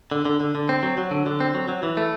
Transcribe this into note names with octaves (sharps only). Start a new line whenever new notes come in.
D3
D3
D3
D3
C4
F#3
F#3
D3
D3
C4
F#3
F#3
E3
A3